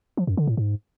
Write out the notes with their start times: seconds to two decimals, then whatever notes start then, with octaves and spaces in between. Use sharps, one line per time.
0.17 F3
0.27 F#2
0.37 D3
0.47 A2
0.57 G#2